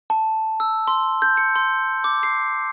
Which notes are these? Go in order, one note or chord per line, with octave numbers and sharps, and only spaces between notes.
A5
E6
C6
G6
C#7
C6
D6
C7